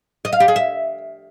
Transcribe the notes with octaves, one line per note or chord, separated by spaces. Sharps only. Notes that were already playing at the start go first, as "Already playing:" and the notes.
D#5
F5
G4
G#4
E5